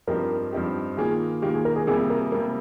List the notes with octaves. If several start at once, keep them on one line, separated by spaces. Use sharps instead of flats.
G2 F3 C4 D#4 G4 A#4
G2 F3 C4 D#4 G4
D#3 A#3 F4 G#4
D#3 A#3 F4 G4
G#4
A#4
G#4
F2 C3 G3 A#3 G#4
A#4
C3 G3 A#3 A#4